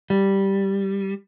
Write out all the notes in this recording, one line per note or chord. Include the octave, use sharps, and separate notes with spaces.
G3